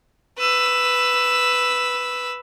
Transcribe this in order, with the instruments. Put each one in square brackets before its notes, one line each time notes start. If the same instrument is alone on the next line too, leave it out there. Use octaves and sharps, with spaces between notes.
[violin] B4 E6